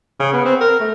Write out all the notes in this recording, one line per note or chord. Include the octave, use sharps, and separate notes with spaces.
C#3
B3
C4
A#4
A3